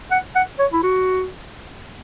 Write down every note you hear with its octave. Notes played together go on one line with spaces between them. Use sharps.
F#5
F#5
C#5
E4
F#4